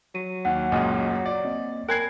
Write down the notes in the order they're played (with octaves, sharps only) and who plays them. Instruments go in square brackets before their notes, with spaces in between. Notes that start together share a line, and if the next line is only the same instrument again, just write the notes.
[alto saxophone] F#3 [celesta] D#7
[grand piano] D#2 [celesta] F#5
[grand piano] C#2 F#2 A#2 [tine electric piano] D#5 G#5 D#6
[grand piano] D5
[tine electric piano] A#3 C4 D#5
[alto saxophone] A#4 [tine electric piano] G5 G#5 B5 [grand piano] F#6 G#6 C7